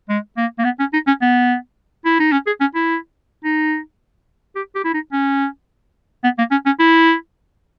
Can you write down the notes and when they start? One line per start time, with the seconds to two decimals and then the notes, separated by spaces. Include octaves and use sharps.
0.09 G#3
0.37 A#3
0.58 A#3
0.64 B3
0.79 C#4
0.93 D#4
1.07 C#4
1.21 B3
2.05 E4
2.19 D#4
2.32 C#4
2.46 G#4
2.60 C#4
2.75 E4
3.44 D#4
4.56 G4
4.75 G4
4.84 E4
4.93 D#4
5.12 C#4
6.24 B3
6.38 A#3
6.51 C#4
6.66 C#4
6.79 E4